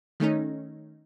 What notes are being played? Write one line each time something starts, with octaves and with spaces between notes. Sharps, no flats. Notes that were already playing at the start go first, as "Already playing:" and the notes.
D#3 A3 C#4 D#4